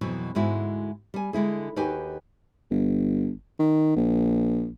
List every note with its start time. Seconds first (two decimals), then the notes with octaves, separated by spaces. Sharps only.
0.01 F2 B2 E3 F#3
0.35 D2 G#2 G#3 E4 F#4
1.14 G3 G#5
1.33 D3 G#3 E4 G#4
1.76 D#2 D#4 F#4 G4 B4 G#5
2.70 G1
3.60 D#3
3.96 A#1